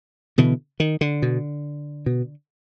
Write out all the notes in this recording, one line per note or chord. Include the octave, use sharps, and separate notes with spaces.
B2 D3 E3
D#3
D3
B2
B2